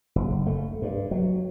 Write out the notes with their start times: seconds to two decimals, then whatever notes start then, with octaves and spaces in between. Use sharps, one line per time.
0.16 F#1
0.47 A3
0.82 G2
1.11 F#3